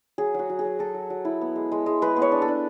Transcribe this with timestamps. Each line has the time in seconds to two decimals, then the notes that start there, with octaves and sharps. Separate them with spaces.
0.18 F#3 G#4
0.34 F#3 F#4
0.49 F#3
0.59 G#4
0.65 F#3
0.79 F#3 A4
0.94 F#3
1.10 F#3
1.25 E4
1.41 B3
1.56 G#3
1.72 G#3
1.86 G#3
2.02 G#3 B4
2.16 B3
2.22 C#5
2.32 D4
2.42 A4
2.48 D4